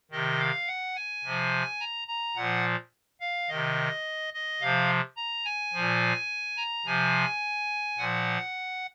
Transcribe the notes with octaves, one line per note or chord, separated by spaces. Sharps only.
C3 D#3 D#5
F5
F#5
G#5
C3 F3
A#5
A#5
A#2 F3 F#5
F5
C3 D#3 D#5
D#5
C3 F3 F5
A#5
G#5
A#2 F3
A#5
C3 F3 G#5
A#2 F3 F#5